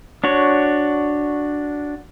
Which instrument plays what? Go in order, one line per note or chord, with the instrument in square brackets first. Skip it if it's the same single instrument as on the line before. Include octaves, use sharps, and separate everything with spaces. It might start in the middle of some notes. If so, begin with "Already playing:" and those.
[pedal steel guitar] D4 F#4 C#5